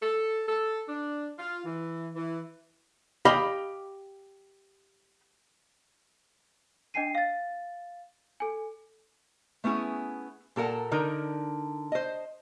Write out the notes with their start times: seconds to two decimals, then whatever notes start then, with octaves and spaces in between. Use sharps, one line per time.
0.02 A4
0.47 A4
0.88 D4
1.38 F4
1.65 E3
2.16 E3
3.25 G4 D#5 F5 B5
6.94 D4 D#5 G5 G#5 C7 D#7
7.15 F5 A6
8.40 A4 G#5
9.64 A3 B3 C#4 E4 G#4
10.56 A#2 A4 A#4 F#5 A5
10.92 D3 D#4 A#4
11.92 C5 D#5